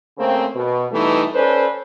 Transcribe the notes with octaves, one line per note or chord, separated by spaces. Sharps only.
C#3 A3 A#3 C4
B2
B2 E3 G3 A3 D#4
C#4 A4 B4 C5 D5